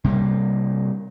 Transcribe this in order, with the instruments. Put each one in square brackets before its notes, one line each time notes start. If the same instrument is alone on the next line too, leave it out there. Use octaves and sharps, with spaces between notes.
[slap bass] C3 G3 G#3 A#3